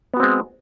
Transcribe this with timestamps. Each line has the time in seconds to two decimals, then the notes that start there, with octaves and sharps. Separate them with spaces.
0.14 B3
0.17 F#4
0.20 C4
0.23 G#3